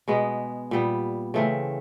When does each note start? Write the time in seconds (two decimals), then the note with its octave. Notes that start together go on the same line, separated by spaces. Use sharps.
0.08 B2 G#3 B3
0.71 A#2 G3 B3
1.34 C#3 E3 A3 C4